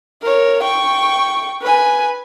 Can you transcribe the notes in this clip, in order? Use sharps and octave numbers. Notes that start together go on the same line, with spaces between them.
A#4 C#5
G5 C#6
B4 G#5